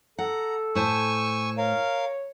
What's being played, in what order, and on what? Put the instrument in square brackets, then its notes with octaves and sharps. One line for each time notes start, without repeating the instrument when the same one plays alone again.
[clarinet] A4 [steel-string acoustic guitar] F#5 [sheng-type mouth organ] A#5
[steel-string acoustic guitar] A2 C5 A5 [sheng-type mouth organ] G#5 C#6 E6
[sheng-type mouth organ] A#4 F5 [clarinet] C#5